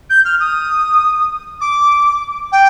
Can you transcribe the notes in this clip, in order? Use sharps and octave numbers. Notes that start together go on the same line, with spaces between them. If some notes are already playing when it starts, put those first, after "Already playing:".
G6
F6
D#6
D6
G5